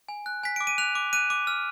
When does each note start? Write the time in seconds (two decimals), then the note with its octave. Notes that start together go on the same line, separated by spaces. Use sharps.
0.09 G#5
0.26 F#6
0.44 G#5 B6
0.56 D6 D7
0.67 D#7
0.78 F#6 F7
0.95 D6
1.13 F#6 D#7
1.30 D6
1.47 F6